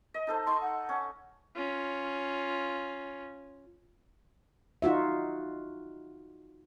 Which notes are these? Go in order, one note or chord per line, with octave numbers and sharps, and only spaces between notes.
D#5
D#4 A4 C5
D#4 C6 C#6
F#5
C#4
C#4 F4
D#4 F4 F#4 E5